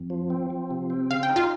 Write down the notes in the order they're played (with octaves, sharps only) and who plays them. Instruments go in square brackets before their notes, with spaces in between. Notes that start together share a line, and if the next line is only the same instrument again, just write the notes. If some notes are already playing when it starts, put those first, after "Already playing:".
Already playing: [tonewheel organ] F2
F3
C4
F3
C3
C4
[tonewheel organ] C#3 [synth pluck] F5
[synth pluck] G5
[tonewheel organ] D#4
[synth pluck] F4 F5